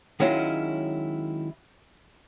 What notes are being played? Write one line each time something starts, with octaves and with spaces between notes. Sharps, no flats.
D#3 F#3 G#3 C#4 E4 F4